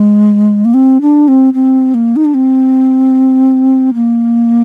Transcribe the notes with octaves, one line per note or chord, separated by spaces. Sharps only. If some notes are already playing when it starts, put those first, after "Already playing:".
Already playing: G#3
A#3
C4
D4
C4
C4
A#3
D#4
D4
C4
A#3